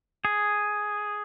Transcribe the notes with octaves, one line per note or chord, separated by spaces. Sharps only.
G#4